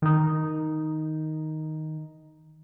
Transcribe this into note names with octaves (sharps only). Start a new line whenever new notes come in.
D#3 D#4